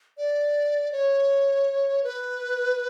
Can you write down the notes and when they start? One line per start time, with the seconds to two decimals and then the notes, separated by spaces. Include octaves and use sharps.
0.18 D5
0.92 C#5
2.04 B4